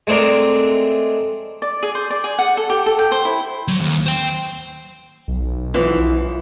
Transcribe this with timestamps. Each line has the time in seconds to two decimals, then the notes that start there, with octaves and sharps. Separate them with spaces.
0.07 G#3 A3 C4 D4 A#4
1.62 D5
1.83 G#4
1.95 C5
2.10 D5
2.24 G#4
2.39 F#5
2.57 A4
2.70 G4
2.86 A4
2.99 G5
3.12 C5
3.25 E4
3.68 F#3
3.81 D#2
4.07 C5 G5
5.28 B1
5.74 F#2 E3 F3